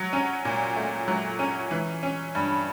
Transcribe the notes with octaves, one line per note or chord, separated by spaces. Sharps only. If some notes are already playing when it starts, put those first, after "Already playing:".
Already playing: F#3
C#4
A#2
A3
F#3
C#4
E3
C#4
G2